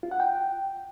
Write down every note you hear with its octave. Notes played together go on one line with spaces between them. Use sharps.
F4
F#5
G5